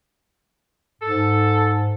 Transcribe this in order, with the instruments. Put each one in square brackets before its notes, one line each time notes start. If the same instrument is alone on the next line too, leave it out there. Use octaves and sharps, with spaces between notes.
[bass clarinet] G#2 [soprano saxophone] A4